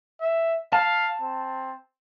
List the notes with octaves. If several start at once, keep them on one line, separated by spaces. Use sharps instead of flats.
E5
F5 A5
C4